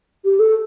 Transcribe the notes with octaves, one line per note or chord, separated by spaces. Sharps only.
G4
A4